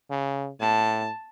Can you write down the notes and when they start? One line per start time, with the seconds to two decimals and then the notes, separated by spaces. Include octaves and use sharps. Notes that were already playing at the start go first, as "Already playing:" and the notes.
0.10 C#3
0.60 A2 A5